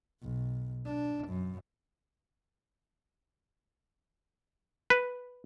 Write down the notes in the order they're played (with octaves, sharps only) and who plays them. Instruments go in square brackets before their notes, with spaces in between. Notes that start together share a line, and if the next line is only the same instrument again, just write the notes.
[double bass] B1
D4
F#2
[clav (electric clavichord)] B4